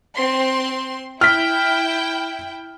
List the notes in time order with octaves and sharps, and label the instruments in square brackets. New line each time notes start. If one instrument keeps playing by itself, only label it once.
[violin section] C4 C6
[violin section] E4 G5 [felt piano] F6 B6